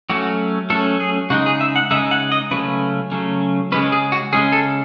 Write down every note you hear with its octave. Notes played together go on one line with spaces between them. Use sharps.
F#3 A3 C#4 F#4
F#3 A3 C#4 A4
G#4
C#3 G#3 D#4 F#4
G#4
E5
F#5
C#3 G#3 D#4 E5
F#5
D#5
C#3 F#3 A3 C#4 B4
C#3 F#3 A3 C#4
C#3 G#3 C#4 B4
G#4
F#4
C#3 G#3 C#4 G#4
A4